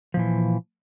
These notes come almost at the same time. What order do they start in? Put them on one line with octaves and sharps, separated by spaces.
F3 A#2 E3